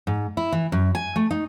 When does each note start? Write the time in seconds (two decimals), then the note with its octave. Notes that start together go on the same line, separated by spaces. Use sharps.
0.07 G#2
0.37 E4
0.52 E3
0.72 F#2
0.95 G#5
1.16 A3
1.31 D#4